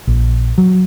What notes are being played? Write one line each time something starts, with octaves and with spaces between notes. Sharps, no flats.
A#1
F#3